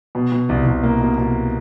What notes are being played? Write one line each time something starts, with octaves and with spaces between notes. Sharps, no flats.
B2
B2
C2
C2
A#3
B2
B2